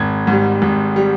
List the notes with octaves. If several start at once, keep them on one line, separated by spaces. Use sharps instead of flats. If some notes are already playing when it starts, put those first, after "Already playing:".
Already playing: G#1 G#6
G#2 G3
G#1
G3